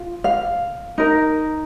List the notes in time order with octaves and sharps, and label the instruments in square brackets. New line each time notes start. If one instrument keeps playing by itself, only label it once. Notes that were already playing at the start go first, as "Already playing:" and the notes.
Already playing: [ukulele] F4
F5
D#4 A#4